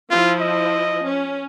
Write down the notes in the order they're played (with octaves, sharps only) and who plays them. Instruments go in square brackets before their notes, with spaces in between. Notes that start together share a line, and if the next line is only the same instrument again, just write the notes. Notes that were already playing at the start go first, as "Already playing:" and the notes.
[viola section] F3 E4 [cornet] F4
[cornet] D#5
[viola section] C#4